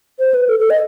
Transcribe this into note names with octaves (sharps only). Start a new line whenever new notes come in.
C5
B4
A4
A4
D#5